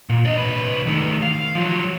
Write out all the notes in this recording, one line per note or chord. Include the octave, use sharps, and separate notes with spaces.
A#2
D4 D#5
C2 B4
D#3 A3
F5
F3 F#3